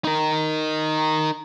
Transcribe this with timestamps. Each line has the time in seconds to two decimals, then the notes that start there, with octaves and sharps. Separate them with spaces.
0.05 D#4 A#4